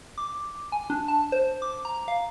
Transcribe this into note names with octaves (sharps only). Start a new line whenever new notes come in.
D6
G#5
D4
A5
C5
D6
A#5
F5